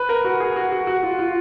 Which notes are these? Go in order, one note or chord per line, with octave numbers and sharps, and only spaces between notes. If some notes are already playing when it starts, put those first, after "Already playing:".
Already playing: B4
A#4
F#4
G#4
F#4
F#4
F#4
F4
F4